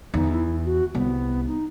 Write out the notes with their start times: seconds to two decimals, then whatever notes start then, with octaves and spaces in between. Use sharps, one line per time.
0.14 E2 D#4
0.33 E4
0.65 F#4
0.95 C2 B3
1.47 D#4